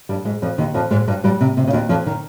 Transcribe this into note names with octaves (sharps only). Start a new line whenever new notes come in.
G2 G3
G#2 G#3
F2 F3
D#2 D#3
F2 F3
G#2 G#3
G2 G3
G2 G3
C3
C3
C#3
D#2 D#3
F2 F3
D#3